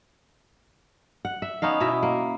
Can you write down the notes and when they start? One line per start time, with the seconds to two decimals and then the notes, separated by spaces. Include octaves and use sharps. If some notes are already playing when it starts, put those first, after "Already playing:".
1.25 F#5
1.42 E5
1.62 B3 C#4 D#4 F5
1.80 B2 E4 D#5 E5
2.03 A#3